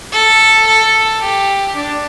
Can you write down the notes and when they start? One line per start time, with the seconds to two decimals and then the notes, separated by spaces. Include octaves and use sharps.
0.11 A4
0.66 A4
1.21 G4
1.75 D4